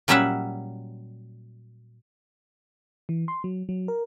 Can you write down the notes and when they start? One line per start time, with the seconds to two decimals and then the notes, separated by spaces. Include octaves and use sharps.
0.08 A#2 F#3 G3 C#4 E5 F#5
3.09 E3
3.28 C6
3.44 F#3
3.69 F#3
3.88 A#4